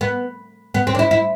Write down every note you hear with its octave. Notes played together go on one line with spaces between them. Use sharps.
B3
B3
C4
D4
E4
E4